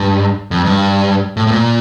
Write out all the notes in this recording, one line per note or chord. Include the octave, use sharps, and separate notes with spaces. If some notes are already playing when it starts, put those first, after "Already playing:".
Already playing: G2
F2
G2
A2
A2
A#2